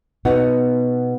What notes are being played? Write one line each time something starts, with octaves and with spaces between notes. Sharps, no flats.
B2 B3 D#4 F#4